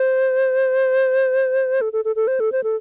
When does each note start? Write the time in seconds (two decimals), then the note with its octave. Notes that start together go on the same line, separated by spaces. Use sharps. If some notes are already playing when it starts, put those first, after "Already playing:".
Already playing: C5
1.81 A4
1.93 A4
2.05 A4
2.16 A4
2.27 C5
2.40 A4
2.52 C5
2.64 A4